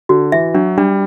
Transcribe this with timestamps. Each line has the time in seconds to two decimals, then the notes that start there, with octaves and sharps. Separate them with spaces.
0.09 D3 F#4
0.32 E3 E5
0.54 F#3 D4
0.78 G3 D4